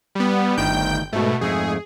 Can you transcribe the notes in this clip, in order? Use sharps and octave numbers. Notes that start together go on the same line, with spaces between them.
G3 B3
G1 D2 D#3 G5 G6
G#2 B2 A3
F2 G#2 A3 G#4